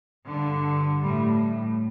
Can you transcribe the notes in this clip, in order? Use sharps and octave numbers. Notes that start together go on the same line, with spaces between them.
G2 D3
A2 G3